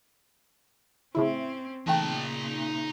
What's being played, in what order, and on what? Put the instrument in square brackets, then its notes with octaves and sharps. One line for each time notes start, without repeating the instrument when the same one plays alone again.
[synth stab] A2 C#3 E4 [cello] C4 C#4
[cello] A#2 C#3 [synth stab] E3 A3 G5 [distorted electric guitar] D#4 A5